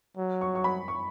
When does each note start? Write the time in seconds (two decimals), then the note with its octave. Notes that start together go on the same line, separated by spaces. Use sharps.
0.17 F#3
0.41 C#6
0.55 C#6
0.64 B5
0.88 C#6